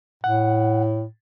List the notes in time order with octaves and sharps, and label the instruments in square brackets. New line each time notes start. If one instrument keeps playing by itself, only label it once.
[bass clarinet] A2 [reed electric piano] F#5